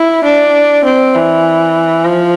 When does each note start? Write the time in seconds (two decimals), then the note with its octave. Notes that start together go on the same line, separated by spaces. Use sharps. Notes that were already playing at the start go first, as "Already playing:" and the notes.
Already playing: E4
0.24 D4
0.84 C4
1.15 E3
2.04 F3